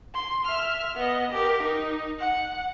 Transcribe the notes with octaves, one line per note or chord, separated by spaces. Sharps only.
C6
E5 F6
B3 D#5
G4 A#4
D#4
F#5